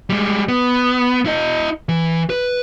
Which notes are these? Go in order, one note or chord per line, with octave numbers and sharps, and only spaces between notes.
G3 G#3
B3
E4 D#5
E3
B4